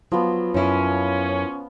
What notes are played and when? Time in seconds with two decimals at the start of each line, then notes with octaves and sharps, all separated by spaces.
0.12 F3 F#3 B3
0.54 F#2 C#4 E4